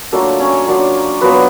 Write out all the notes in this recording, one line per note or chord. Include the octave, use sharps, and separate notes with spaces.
F#3 A3 A#3 D4 F4 A4
C#4 C#5
F#3 A#3 D4 F4
F#3 A#3 B3 D4 F4 B4